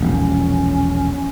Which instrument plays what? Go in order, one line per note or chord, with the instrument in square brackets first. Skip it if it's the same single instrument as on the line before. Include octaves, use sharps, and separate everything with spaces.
[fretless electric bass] E1 A#1 [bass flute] C#4